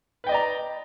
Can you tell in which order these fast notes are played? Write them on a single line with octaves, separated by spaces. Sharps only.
B4 G5 D#5 D5 A#5